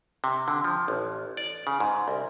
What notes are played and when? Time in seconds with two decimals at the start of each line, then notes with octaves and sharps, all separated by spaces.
0.24 C3
0.48 D3
0.65 F3
0.88 A1
1.37 D5
1.67 C#3
1.80 G#2
2.08 C2